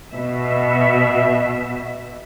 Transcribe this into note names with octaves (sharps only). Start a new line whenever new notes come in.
B2 E5